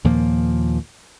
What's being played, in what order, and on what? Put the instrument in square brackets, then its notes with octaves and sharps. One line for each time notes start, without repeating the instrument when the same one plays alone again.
[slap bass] D#2 A#2 F3 A#3